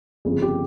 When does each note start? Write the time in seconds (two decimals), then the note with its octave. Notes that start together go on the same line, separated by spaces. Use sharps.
0.25 G1 F2 C#3 G#4
0.42 G4